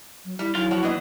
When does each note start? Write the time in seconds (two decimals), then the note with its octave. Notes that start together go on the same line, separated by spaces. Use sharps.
0.25 F#3
0.39 G3 E4
0.55 D#3 F#3 E4 F4 G#4
0.71 F3 F#4 C#5
0.83 D#2 E3 B3 D4 D#5